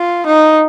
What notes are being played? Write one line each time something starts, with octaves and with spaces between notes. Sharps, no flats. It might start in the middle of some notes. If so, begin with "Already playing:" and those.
Already playing: F4
D#4